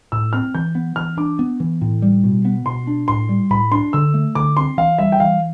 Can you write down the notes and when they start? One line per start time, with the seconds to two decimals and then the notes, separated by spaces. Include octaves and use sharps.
0.12 A2 E6
0.33 C4 F6
0.55 E3 G6
0.75 B3
0.96 E3 F6
1.17 D4 D6
1.39 B3
1.60 E3
1.81 A2
2.02 G3
2.24 B2
2.45 B3
2.66 B2 C6
2.87 D4
3.08 A2 C6
3.29 G3
3.50 A2 B5
3.72 D4 C6
3.93 D3 E6
4.14 A3
4.35 D3 D6
4.57 C4 C6
4.77 E3 F5
4.99 G3 E5
5.12 G5
5.20 E3 F5